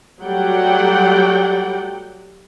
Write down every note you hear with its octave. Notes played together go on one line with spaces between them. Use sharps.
F#3 G3 A3 D5 F#5 G5